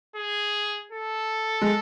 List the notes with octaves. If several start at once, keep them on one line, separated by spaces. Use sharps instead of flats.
G#4
A4
G#3